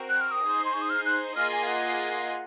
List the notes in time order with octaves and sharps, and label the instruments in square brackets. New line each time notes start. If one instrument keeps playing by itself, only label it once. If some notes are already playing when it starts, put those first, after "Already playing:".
Already playing: [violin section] C4 F#4 A#4
[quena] F#6
F6
D#6
[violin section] D#4 G#4 C5
[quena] C6
C#6
D#6
F6
F#6
[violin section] A#3 F4 G#4 D#5 [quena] F6
[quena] G#5
F5
F#5